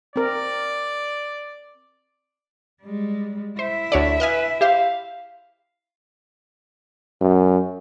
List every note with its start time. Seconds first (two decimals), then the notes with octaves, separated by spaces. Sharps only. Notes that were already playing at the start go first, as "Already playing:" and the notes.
0.16 C4 A#4 D5
2.82 G3 G#3
3.59 E4 C5 E5
3.92 D2 D3 C#5 D5
4.20 B4 D#5 F5 G#5
4.61 G4 C5 F5
7.21 F#2